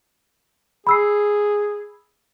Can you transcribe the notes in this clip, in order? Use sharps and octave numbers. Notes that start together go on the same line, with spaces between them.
G#4 B5 E6 C7